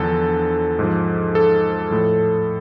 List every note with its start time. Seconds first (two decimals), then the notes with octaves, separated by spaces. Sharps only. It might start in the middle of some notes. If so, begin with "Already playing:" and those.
Already playing: E2 D3 F3 A4
0.79 G#2 F3
1.35 A4
1.91 A2 F3